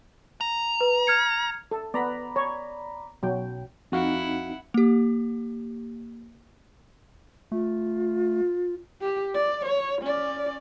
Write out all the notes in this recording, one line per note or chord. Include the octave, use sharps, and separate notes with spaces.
A#5
B4
F6 G#6 C#7
A4
B3 D5 A#5 B5
C#5
B1 F#3 G5
F2 C4 D#4 E4 F#4 F5 F#5
A#3 G4
A3 F4
G4
D5
C#5
C#4 D5